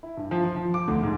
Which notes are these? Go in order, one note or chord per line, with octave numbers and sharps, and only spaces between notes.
E4
G2
F3
F3
F3
D6
D2
G#2